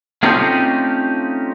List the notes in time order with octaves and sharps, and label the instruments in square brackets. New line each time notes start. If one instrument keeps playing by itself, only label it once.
[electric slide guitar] A3 C4 C#4 D#4 F4 G4